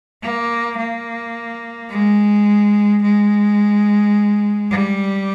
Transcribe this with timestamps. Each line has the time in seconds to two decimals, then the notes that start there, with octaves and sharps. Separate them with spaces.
0.23 A#3
0.78 A#3
1.90 G#3
3.02 G#3
4.71 G3